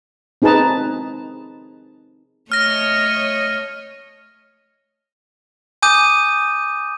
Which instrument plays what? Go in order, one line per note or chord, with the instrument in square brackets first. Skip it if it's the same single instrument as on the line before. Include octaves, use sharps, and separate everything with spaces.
[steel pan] C4 D#4 G#4 B4 A5 A#5
[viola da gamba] A3 C#5 D#5 [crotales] F6 A#6
[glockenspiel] G#5 D6 D#6 G6 D#7